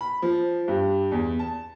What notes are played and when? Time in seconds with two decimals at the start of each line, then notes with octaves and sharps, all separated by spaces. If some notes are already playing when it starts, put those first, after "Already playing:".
0.01 B5
0.22 F3
0.68 G2
1.11 E2
1.39 A5